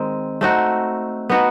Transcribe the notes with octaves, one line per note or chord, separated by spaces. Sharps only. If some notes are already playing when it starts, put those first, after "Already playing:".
Already playing: D#3 G#3 C4
A3 C4 D#4 F#4
B3 D#4 F#4